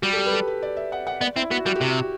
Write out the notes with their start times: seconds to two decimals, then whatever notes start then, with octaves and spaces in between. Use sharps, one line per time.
0.02 G3 F#4
0.13 A4
0.17 G4
0.26 B4
0.33 A4
0.48 B4
0.62 D5
0.77 E5
0.92 F#5
1.07 F#5
1.21 B3 D5
1.36 C4 E4
1.50 B3 F#4
1.66 G3 F#4
1.75 G4
1.81 C3 F#4